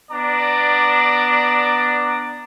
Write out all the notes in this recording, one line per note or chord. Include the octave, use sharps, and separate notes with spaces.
B3 D4 D5 A#5